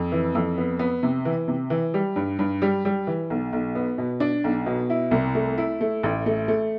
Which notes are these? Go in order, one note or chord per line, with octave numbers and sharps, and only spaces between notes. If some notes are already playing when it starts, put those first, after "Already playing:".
Already playing: F2
E3
F2
B3
B3
C3
E3
C3
E3
G3
G2
G2
G3
G3
E3
B1
B1
B3
B2
D4
B1
B2
E4
C2
A3
E4
A3
A1
A3
A3